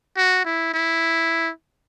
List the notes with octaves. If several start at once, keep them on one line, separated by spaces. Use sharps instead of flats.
F#4
E4
E4